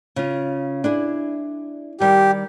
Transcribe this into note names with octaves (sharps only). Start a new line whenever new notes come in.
C#3 F4
D4 E4 G#4
D#3 G3 G4